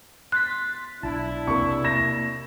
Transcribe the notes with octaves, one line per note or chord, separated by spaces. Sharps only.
C6 F#6 A6 B6
B1 D4 E4 A5
C3 A#3 C#6
A#6 E7